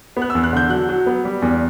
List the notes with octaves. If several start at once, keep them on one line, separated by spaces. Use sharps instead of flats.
B3
F#6
E2 E6
F#6
D3 G6
F#3 F#6
F#3
B3
G3
E2